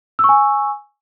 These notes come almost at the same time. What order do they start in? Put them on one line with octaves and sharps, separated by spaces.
E6 C#6 G#5